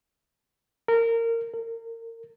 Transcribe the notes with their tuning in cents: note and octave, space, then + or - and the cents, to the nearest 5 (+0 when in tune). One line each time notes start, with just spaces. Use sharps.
A#4 -20
A#4 -30